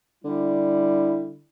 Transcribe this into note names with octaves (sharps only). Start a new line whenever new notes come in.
D3 G3 E4